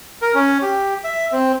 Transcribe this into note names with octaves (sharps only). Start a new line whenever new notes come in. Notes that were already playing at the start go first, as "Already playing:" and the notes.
A#4
C#4
G4
E5
C4